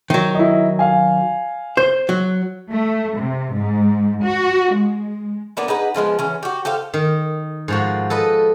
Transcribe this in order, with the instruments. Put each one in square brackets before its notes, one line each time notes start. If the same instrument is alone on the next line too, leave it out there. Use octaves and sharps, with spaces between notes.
[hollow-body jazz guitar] D#3 F#3
[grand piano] E4 D#5
F5 G#5
[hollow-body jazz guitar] C5 [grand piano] G6
[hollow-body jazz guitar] F#3
[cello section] A3
C3
G#2
F#4
G#3
[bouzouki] A#3 B3 D4
D#4 G#4 B4 F#5
D3 F3 G#3 B3
E3 C#4
F#4 G4
G4 A4 C5 F5
[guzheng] D#3
G#2 F3 F#4
A4 B4 D#5